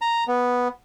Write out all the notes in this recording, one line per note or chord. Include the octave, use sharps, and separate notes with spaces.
A#5
B3